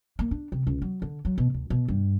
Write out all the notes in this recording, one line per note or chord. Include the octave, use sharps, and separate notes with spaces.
A#3
D4
C3
C#2
F#3
D3
F#3
B2
D2
B2
G2